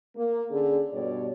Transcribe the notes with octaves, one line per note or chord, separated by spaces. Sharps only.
A#3
D3 C#4 G#4
G2 B2 G3 C#5 D5